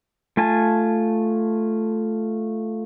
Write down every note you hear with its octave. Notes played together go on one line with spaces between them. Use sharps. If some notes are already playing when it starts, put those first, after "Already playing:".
A3 F4 G#5 A5